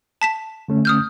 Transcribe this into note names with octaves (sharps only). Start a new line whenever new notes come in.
A5 B6 E7
D3 A3 C#4
D#6 F6 G6